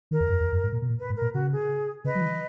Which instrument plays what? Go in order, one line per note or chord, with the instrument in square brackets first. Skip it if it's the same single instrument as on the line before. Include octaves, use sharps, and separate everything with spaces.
[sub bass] D#3 [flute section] A#4
[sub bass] E2
F#2
E2
F#2
G#2
A#2
B2
A#2
[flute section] B4
[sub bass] G#2
[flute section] A#4
[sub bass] A#2
[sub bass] C#3 [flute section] F#4
[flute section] G#4
[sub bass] C#3 [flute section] B4 D#5
[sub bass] F#3
E3